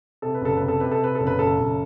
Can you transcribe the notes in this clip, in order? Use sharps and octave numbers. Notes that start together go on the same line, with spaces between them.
C3 A4
B4
F#1 A4
C3 B4
A4
C3 B4
A4
C3 B4
F#1 A4
B4
F#1 A4
F#1